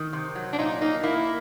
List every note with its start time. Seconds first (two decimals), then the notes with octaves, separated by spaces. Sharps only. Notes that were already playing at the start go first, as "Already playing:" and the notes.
Already playing: D#3
0.13 C3
0.35 F#3
0.53 D4
0.58 A#2 D#4
0.81 A#3 D#4
1.03 A#3 E4